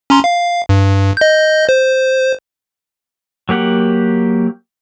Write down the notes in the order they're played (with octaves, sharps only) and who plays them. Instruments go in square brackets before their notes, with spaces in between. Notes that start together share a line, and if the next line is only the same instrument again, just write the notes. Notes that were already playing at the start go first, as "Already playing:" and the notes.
[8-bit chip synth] C#4 A#5 C6
F5
G2
D#5 G6
C5
[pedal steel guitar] F#3 A#3 G4 F#5